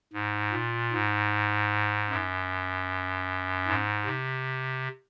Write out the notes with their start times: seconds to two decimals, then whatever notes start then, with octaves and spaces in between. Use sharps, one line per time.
0.13 G#2
0.52 A#2
0.92 G#2
2.10 F#2
3.67 G#2
4.06 C3